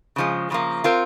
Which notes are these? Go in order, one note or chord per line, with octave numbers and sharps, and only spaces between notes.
C#3 F3 G#3
C#3 F3 A#3
C4 F4 A#4